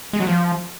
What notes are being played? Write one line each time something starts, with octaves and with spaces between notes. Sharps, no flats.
G#3
F#3
F3